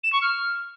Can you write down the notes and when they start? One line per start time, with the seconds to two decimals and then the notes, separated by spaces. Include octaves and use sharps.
0.03 E7
0.12 C#6
0.21 F6